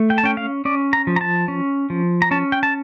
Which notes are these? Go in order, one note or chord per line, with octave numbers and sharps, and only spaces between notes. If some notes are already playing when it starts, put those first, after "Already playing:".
Already playing: A3
G5
A5
C#4 G5
F5
C#4 D5
A#5
F3
A#5
A5
C#4
F3
A#5
C#4 A5
G5
A5